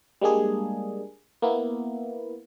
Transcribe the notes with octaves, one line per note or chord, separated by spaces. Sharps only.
G3 G#3 A#3 D4 G#4
A#3 B3 E4